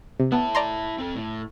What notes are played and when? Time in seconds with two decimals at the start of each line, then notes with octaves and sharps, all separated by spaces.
0.20 C3
0.32 B3 E4 A5
0.55 D5 A#5 C6
0.98 C4 A4
1.15 A2